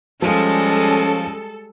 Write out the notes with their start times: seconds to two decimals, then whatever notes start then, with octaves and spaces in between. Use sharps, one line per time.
0.22 F3 G3 G#3 C#4 F4 A4